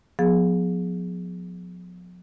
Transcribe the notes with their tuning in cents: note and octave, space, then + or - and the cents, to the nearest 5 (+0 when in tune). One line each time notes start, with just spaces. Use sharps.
F3 +45 B3 +0 G#4 +0